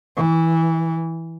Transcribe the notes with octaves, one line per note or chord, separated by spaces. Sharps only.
E3